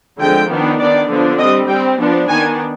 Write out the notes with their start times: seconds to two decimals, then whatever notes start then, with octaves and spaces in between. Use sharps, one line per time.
0.19 D3 F3 G#3 C4 G5
0.49 D#3 B3 D4
0.78 D#3 B3 D4 D5
1.09 D3 F3 B3 D4
1.39 C4 D#5
1.43 G3
1.68 G3 C4 G5
1.98 F3 B3 D4
2.28 D#3 B3 D4 G#5